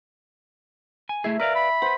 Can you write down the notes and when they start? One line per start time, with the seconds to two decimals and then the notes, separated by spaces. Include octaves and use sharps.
1.09 G#5
1.24 A3 E4 G#4 E5
1.40 A#4 B4 D5 F5 E6
1.55 B5
1.82 B4 C5 F#5